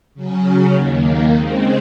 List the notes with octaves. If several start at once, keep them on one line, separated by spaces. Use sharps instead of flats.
C#3 F#3 C#4
D#2 D#3 A#3
C#3 G#3 C4